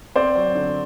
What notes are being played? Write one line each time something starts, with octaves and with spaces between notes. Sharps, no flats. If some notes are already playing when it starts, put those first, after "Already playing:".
C4 C5 D5
F#3
D3